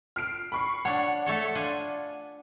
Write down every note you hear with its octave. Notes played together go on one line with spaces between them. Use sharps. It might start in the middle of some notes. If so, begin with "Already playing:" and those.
F6 C7 D7
B5 C#6 C7
D4 C#5 F#5
A3 A4 C#5
D4 F4 G#5